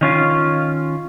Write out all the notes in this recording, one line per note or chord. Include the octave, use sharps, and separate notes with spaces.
D#3 C#4 F4